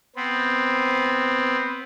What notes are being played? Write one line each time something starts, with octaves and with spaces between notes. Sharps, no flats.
B3 C4